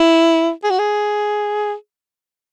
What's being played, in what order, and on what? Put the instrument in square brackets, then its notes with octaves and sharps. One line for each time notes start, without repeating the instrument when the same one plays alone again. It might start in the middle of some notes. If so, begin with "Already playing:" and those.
Already playing: [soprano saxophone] E4
G#4
F#4
G#4